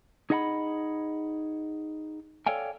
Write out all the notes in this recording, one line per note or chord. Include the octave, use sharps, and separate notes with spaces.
D#4 G#4 D#5 F#5 G#5 B5
A4 C#5 D5 F5 G5 G#5